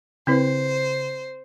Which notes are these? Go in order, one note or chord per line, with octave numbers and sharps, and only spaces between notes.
C#3 C4 E4 B4 C5